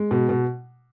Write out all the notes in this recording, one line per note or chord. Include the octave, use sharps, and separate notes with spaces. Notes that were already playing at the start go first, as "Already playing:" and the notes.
Already playing: G#3
B2
B2